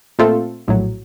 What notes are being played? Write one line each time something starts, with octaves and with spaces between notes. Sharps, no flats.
A#2 A3 C4 F4 A4
A#1 A2 F#3